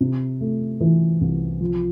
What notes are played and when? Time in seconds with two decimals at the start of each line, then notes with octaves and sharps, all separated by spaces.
0.01 C3
0.41 A3
0.81 E3
1.21 C2
1.61 F3